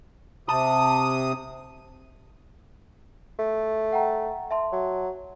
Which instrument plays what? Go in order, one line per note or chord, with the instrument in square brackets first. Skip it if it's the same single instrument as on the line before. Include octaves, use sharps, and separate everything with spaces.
[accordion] C3 D#6 [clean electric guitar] A5
[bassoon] A3
[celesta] F#5 G5 A#5
E5 A5 C6
[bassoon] F#3